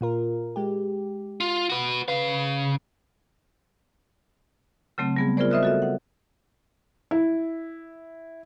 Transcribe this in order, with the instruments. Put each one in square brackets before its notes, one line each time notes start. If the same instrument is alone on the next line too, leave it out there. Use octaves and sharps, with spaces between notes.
[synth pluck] A#2 F4 A#4
G#3 G4
[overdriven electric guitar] F4
F#4 B4
[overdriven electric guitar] C#3 F5 [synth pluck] B4 B5
[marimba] C#3 F#3 A3 C4
G3 B3 G#4
F4 G#4 A#4 C5 D5
C5 D#5 E5 D#6 F6 F#6
F#4 A4 E5
F#5
[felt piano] E4